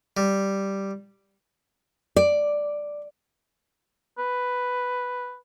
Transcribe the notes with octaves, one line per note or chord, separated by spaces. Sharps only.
G3
D5
B4